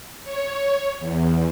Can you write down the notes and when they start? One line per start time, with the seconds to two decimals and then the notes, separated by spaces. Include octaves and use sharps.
0.24 C#5
1.00 E2